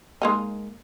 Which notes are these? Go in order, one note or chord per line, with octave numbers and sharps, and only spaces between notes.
G#3 A#3 D#4